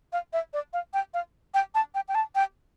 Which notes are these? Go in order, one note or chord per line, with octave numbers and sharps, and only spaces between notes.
F5
E5
D5
F5
G5
F5
G5
A5
G5
G5
A5
G5